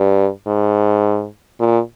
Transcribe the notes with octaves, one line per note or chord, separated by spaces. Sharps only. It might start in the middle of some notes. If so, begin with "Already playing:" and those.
Already playing: G2
G#2
A#2